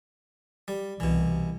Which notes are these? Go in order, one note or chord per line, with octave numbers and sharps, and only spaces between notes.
G3
C2 B2 E3